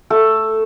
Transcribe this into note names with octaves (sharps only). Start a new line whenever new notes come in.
A3 A4